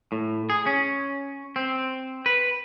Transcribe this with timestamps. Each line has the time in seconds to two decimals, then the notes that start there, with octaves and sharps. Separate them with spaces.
0.12 A2
0.50 G#4
0.66 C#4
1.56 C4
2.26 B4